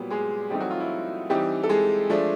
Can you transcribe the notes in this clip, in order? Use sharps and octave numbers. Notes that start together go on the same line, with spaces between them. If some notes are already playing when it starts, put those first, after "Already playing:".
Already playing: A#2 F#3 G3 B3 G4
G#3 G#4
E3 G3 A3 C4 D#4 G4
F#3 F#4
F4
E4
E3 G3 C4 D#4 G4
A4
G#3 G#4
F3 A3 D4